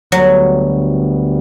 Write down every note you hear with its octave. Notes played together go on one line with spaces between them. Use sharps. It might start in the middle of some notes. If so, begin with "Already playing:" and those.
D2 D3 F#3 G3 B3